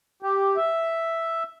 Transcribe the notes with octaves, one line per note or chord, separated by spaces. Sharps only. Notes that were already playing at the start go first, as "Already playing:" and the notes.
G4
E5